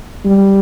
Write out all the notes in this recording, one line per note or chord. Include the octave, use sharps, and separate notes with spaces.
G3